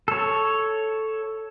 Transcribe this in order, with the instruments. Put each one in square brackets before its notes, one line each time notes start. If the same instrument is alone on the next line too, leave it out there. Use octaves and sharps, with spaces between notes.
[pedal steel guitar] A4 C#5